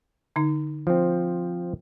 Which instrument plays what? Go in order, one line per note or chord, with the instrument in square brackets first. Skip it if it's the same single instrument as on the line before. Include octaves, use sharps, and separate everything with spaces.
[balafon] D3 D#4
[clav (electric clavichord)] F3 C4